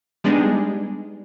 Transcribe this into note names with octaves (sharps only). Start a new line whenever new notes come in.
G3 G#3 B3 D4 D#4 G#4